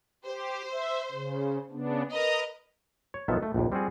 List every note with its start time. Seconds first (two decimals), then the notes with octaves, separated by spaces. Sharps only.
0.24 G4 C5
0.72 E5
1.12 C#3
1.71 C#3 B3 D4
2.11 A#4 B4 D#5 A#5 D#6
3.14 C#5
3.28 B1 D#3 F3 B3 A4 E5
3.43 A3
3.54 A#1 D#2
3.72 G3 C4 F4 F#4 G#4